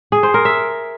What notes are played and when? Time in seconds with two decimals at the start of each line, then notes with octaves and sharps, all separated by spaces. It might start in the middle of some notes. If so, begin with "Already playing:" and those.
0.12 G#4
0.23 C5
0.34 A#4
0.45 E5